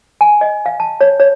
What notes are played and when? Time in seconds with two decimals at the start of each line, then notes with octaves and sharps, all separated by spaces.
0.21 G#5
0.41 D#5
0.66 F5
0.80 A5
1.01 C#5
1.20 C#5